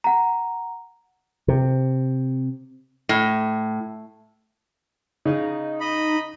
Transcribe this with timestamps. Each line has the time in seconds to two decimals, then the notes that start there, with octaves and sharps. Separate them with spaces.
0.04 F#5 A#5
1.48 C3
3.09 A2
5.25 C#3 D#4
5.80 D#5 B5